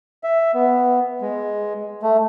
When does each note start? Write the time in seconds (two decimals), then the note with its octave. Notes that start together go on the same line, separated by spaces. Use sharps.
0.24 E5
0.54 B3
1.22 G#3
2.03 A3